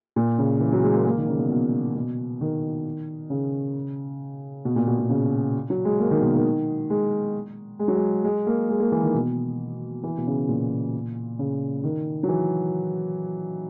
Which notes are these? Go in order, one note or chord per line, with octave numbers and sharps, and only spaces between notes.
A#2
C#3
E3
F#3
G#3
A#3
A#3
D#3
C#3
B2
B2
B2
D#3
C#3
B2
A#2
B2
B2
C#3
F#3
G#3
A#3
D#3
B2
D#3
G#3
G#3
F#3
G#3
G#3
A#3
G#3
A#3
E3
D#3
B2
E3
B2
C#3
A#2
C#3
D#3
F#3
E3